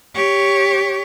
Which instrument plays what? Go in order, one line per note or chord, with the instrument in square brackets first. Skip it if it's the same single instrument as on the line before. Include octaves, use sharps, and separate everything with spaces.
[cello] G4 C#5